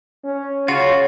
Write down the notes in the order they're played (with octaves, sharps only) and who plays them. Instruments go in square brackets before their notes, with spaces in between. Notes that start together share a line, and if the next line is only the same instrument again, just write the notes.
[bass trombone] C#4
[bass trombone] C#3 [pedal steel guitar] F4 F#4 [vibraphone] C#5